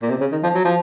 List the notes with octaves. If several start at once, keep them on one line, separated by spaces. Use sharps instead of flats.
A#2
C3
C#3
D#3
F3
F#3
F3